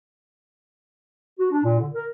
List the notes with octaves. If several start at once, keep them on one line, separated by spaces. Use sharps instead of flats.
F#4
D4
A#2
D3
A#4